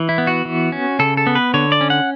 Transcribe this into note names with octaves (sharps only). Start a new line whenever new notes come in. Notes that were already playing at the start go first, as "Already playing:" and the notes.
Already playing: E3
E4
B3
F#4
E3
C#4
C#3 A4
A4
B3
B4
D3 C#5
D5
C#4
F#5